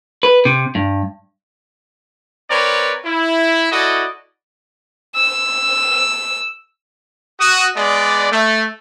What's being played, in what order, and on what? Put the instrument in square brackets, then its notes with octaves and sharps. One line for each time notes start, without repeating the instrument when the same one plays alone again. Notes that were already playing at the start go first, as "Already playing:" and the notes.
[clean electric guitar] B4
C3
G2
[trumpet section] C4 A#4 B4 C#5 D5
E4
E4 F#4 A4 D5 D#5
[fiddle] E6
[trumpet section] F#4 D#6
G#3 B3 D5
A3